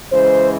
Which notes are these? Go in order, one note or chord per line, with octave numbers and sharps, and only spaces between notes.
C#3 E3 G#3 C5